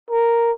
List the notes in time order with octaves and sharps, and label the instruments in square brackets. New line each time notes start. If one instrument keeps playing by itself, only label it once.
[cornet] A#4